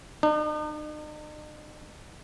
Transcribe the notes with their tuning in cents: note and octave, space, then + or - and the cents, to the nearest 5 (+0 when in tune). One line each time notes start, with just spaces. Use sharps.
D#4 -45